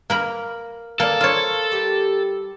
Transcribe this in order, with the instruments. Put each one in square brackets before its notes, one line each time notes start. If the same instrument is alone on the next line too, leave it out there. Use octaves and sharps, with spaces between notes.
[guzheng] A#3 A#4 B5
[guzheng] A#3 [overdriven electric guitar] A4 [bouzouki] D5 F5 G#5
[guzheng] F4 C#5
[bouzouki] G3 G4